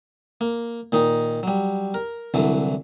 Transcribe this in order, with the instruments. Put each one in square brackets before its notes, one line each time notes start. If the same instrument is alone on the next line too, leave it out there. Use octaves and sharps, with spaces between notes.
[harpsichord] A#3
A#2 D#3 D#4
F#3 G3
A#4
C2 D3 E3 F#3